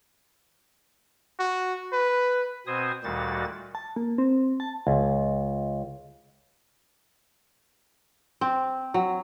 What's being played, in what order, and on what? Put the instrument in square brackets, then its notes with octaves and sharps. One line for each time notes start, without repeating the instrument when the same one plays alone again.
[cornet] F#4
B4
[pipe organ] B2 C4 C5 G#5 D#6
D2 A#2 D#3 G3 F#4 A6
[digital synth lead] A5
A#3
C4
A5
[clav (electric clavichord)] C#2
[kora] C4
F#3